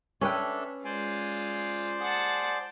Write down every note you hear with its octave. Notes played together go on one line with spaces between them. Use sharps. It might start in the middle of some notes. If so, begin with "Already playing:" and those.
C#4 D4 A4 B4 E5 G5
G#3 F4 C5 D5 G#5
G#4 F#5 A5